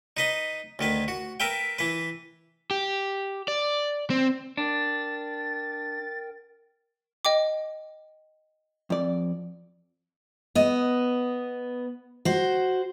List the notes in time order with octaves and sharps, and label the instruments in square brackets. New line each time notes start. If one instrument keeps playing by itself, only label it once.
[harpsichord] D#4 B4 D#5
D2 D#3 B4
F#4
A#4 B4 E5 G5
E3 B4
[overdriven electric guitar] G4
D5
C4
[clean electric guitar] D4 [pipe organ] A#4 G5 [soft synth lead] A6
[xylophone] D#5 G5 D6
[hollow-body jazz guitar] F2 D5
[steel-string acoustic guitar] B3 D#5
F#4 C5